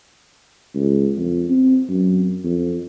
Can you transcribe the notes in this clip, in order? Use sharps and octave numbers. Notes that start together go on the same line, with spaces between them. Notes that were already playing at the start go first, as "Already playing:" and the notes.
C#2
F2
C4
F#2
F2